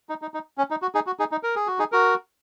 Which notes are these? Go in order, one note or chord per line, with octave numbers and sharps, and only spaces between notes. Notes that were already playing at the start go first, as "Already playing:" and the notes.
D#4
D#4
D#4
C#4
D#4
F#4
D#4 G#4
F#4
D#4 G#4
D#4
A#4
G#4
F#4
D#4 G#4
F#4 A#4